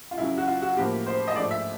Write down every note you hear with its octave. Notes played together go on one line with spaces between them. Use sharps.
F4
F#2 C#3 F#3 E4
F#4
F4
F#4
A2 F3 A#3 G4
C5
D#5
G#2 F3 A3 D5
E5